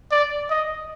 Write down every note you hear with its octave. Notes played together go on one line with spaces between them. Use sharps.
D5
D#5